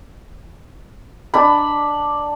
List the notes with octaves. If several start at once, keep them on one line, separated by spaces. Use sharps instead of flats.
D4 B5